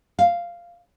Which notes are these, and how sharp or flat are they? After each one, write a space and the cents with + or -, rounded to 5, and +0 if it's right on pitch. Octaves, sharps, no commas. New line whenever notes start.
F5 -10